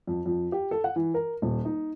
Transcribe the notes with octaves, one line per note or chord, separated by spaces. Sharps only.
F2
F2
G4
A4
F#5
E3
A#4
D#1
D#4